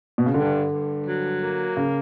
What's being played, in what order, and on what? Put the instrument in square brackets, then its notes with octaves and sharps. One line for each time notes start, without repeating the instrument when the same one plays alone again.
[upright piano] B2
C#3
[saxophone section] G2 [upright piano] D3
[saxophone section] G2
F#3
A#3
[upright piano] C#3